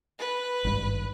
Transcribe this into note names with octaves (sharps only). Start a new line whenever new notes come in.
B4
G#1 G2